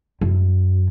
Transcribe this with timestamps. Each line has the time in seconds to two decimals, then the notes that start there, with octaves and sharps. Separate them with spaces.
0.21 F#2